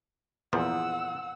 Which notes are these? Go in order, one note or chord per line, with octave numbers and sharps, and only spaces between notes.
E2 A#2 F3 F#5 E6